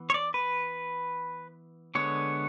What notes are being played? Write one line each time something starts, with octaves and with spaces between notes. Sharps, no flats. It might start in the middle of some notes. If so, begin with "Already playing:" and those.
Already playing: E3 B3
C#5
D5
B4
D3 G#3 B3 C#5